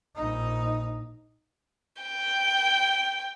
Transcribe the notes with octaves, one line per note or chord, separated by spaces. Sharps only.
A#1 D#4
G5